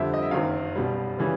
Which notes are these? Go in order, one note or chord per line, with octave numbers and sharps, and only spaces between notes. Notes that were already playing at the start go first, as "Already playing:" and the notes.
Already playing: F2 D3 G3 E5
D#5
E5
F#1 F#2 D#3 F#3 F5
B1 B2 G3
C#3 E3 G3